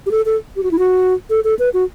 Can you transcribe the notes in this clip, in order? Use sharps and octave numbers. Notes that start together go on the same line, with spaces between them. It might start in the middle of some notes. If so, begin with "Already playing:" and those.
G4
A4
A4
G4
F#4
E4
F#4
A4
A4
B4
F#4